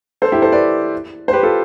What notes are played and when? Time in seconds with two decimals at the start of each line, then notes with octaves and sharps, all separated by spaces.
0.22 A4 C5
0.32 E4 G4
0.42 A4 C5
0.52 B4 D5
1.28 C5
1.33 G4 B4
1.43 F4 A4